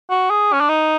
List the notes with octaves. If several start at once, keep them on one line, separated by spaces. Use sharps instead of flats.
F#4
G#4
C#4
D4
D#4